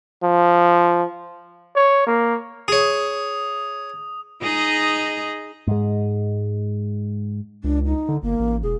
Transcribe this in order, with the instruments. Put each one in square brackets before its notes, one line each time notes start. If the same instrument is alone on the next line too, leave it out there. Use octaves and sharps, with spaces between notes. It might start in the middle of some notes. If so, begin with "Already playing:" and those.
[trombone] F3
[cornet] C#5
A#3
[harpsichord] G#4 C#5 [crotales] D#6
[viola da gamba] D#4 G#4 D#5
[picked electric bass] G#2 G#3
[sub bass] C#2 [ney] D4
[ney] D#4
[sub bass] D3
[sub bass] G1 [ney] A#3
[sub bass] A1
[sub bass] E1 [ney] G#4